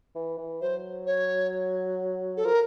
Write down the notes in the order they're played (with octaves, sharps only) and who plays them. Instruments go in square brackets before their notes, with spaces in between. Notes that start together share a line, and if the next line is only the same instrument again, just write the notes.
[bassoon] E3
E3
[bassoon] F#3 [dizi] C5
[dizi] C#5
A4
[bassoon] F3 [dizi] A#4